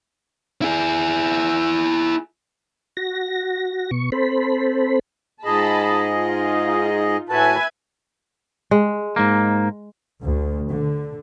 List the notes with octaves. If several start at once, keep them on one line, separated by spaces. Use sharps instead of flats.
E4 G#4
F#4 A#6
B2 C#6
C4 A4 C5 B5
G#2 F4 G#4 D#5 A5 B5
D#4 F4
A2 F#4 B4 E5 G#5 A5
G#3
G#2 A#3
D2
D3